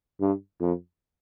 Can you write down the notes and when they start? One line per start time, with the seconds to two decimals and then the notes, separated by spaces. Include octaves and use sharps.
0.21 G2
0.61 F2